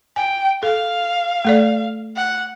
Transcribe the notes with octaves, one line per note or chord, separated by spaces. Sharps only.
G5 G#5
A4 F5
A3 A4 D5
F#5